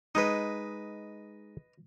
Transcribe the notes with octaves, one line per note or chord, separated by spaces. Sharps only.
G#3 D#4 B4 D#5